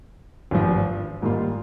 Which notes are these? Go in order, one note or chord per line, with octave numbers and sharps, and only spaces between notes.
G#1 G2 F3
G#2 D#3 G3 A#3 F4